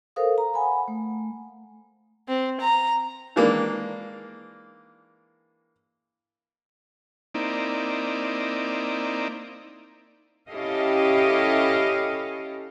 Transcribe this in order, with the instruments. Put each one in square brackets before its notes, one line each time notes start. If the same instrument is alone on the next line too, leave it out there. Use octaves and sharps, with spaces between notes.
[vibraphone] A4 A#4 C5 F5 D#6
A#5
F#5 G#5 B5
A3
[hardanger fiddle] C4
A#5
[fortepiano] D#3 E3 G#3 A#3 D4
[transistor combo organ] A#3 C4 D#4 E4 D5
[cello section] C#4 E4 G4 A4 D#5 F5